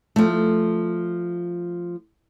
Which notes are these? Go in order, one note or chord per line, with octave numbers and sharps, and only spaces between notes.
F3 A3